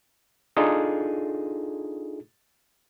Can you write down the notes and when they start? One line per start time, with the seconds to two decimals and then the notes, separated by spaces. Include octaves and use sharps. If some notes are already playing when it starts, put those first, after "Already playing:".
0.57 D4 D#4 F4 G#4 A4